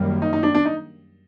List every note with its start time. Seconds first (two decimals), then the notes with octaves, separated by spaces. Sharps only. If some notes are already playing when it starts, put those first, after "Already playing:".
Already playing: F#2 D#3 G3 A#3
0.22 D#4
0.33 D#4
0.43 D4
0.54 D4
0.65 D#4